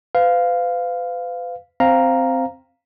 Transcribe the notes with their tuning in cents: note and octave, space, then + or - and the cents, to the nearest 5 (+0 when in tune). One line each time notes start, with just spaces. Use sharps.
B4 +40 F5 +0
C4 +0 F5 +0 A#5 +0